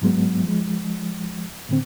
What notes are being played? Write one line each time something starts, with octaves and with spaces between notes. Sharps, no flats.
G#2 F#3 G#3 B3
F3 G#3
A2 D3 C4